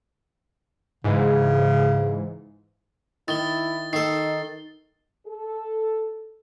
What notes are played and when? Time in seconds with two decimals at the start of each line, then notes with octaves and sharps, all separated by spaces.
1.04 G#2 C#3 E3
3.28 D#3 E4 A6 G7
3.93 D#3 D#4 A4 C7
5.26 A4